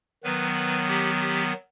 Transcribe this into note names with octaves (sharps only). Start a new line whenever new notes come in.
D#3 F#3 B3 B4
B4
G4
G4